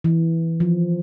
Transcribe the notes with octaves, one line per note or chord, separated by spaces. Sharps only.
E3
F3